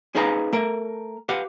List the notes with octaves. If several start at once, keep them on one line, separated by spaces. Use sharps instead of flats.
C#4 D#4 G#4 B4 F5 A#5
A3 A#4
G4 B4 F5 F#5